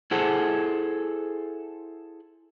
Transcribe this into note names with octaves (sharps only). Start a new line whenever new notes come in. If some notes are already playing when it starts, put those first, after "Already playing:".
E4 G#4 A4 C5 F#5